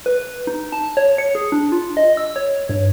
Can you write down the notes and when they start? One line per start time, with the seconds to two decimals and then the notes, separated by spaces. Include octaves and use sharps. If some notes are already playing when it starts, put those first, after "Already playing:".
0.06 B4
0.47 D#4
0.72 A5
0.97 C#5
1.18 C#7
1.35 G#4
1.52 D4
1.72 F4
1.97 D#5
2.17 E6
2.36 C#5
2.69 G2